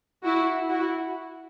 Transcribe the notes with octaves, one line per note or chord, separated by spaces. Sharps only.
E4 F#4
E4 F#4